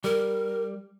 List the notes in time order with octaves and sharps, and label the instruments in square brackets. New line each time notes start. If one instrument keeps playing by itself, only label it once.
[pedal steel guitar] G3 [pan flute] A#4